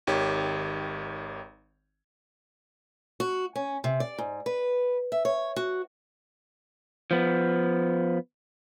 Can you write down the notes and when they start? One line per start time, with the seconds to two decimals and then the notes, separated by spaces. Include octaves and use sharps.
0.07 G#1 D#3 G4 C#5
3.20 F#4
3.56 C#4
3.84 C3
4.00 D5
4.18 G#2
4.46 B4
5.12 E5
5.25 C#5
5.56 F#4
7.11 F3 B3